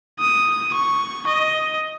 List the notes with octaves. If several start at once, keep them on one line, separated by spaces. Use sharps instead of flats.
D#6
C#6
D#5